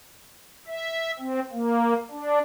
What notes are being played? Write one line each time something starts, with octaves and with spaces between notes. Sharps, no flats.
E5
C4
A#3
D4